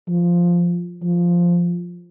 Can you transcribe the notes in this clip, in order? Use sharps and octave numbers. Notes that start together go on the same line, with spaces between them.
F3
F3